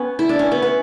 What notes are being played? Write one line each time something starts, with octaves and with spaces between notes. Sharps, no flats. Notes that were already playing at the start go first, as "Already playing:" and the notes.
Already playing: B3 C#4
E4
D4
C#4
B3
B3